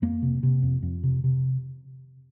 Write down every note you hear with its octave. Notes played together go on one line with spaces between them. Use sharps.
F2 A#3
C3
C3
F2
F2
C3
C3